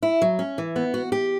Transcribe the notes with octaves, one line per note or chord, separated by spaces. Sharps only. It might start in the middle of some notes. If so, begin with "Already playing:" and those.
E4
F#3
C#4
E3
B3
F#4
G4